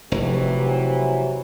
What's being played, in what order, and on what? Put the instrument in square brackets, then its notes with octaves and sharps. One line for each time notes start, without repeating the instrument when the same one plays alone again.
[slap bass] F1 [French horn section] C3 E3 F#3